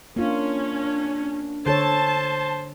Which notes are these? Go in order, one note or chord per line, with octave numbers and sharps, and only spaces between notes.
A#3 C#4 D4 F4
D3 A4 C5 C#5 A5